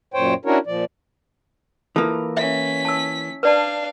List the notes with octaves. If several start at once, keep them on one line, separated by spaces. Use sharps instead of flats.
F#2 A#2 C5 C#5 G5
C#4 D4 E4 F#4 A#4 C#5
A#2 F3 D5
E3 A#3 F4 A4 A5
C#4 E5 B6
A5 E6
D4 B4 D5 F5 A5